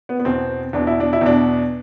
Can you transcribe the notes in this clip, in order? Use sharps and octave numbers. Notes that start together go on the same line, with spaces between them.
B3
B3
E2 B2 C4
E2 B2 D4
E4
D4
E4
E2 B2 D4